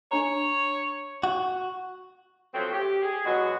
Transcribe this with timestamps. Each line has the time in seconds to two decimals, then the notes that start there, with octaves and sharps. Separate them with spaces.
0.11 D4 C#5 A#5
1.23 F#4
2.54 F3 F#3 A3 C4
2.73 G4
3.01 G#4
3.25 B2 F#3 G#3 F#4